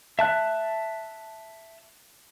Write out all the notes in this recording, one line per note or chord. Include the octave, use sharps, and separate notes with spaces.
E5 A5 F#6